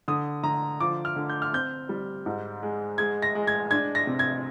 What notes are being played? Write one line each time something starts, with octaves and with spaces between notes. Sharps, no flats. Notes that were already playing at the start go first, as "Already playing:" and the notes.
D3 D#6
D3 A#5
F3 D6
F6
D3
G6
F6
C4 G6
G3
G#2
G#3
G#3 G#6
A#6
G#3
G#6
D4 G#6
A#6
C3
G#6